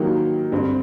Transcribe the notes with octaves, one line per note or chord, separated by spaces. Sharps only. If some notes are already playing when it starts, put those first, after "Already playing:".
Already playing: D#3 F#3 A#3 D#4 G4
G2 D3 G3 C4